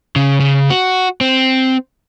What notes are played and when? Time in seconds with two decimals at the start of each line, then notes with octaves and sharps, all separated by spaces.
0.16 C#3
0.40 C#3
0.70 F#4
1.21 C4